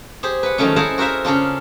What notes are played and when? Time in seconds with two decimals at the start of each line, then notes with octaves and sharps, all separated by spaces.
0.23 G4 G#4 C5
0.43 B4 F#5
0.58 D#3 F3 F#3 A3 C#4
0.76 E4 G#4 C5 F#5 A5 A#5
0.98 F#4 A#4 C5 E5 F5
1.25 C#3 C#4 D4 F4